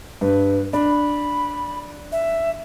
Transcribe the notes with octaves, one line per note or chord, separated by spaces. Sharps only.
G2 B4
D4 B5
E5